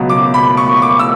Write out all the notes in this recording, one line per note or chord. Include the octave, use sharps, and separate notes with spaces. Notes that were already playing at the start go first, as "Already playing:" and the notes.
Already playing: C#2 B2 F#3
D6
B5
C#6
C#6
D6
E6